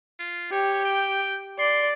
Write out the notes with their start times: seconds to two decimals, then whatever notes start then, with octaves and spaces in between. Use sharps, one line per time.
0.19 F4
0.52 G4 C#5
0.85 G5
1.59 D5 C6